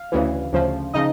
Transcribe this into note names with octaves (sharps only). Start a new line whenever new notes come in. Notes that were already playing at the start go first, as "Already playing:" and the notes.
Already playing: F5
D2 C#3 E3
D2 C#3 F3
C#3 F3 D#4 D#5